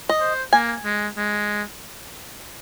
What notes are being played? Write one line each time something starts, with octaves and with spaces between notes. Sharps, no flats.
D#5
C5
A#3 G#5
G#3
G#3